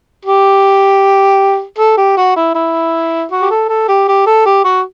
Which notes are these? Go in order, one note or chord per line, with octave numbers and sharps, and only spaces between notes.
G4
A4
G4
F#4
E4
E4
F#4
G4
A4
A4
G4
G4
A4
G4
F#4